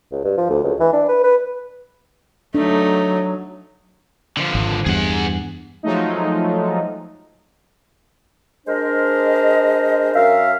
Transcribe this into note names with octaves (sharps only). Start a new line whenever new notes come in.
C#2
G2
F3
D2
C#2
E3
D4
B4
B4
F#3 A3 D4 D#4
D3 F3
G#1
E2 G2 G#4 F#5
F3 F#3 G#3 A3 D#4
G#3 D4 A#4 C5 D#5
F#2 A#4 E5 F5